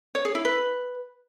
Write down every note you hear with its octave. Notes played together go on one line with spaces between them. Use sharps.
C#5
G#4
E4
B4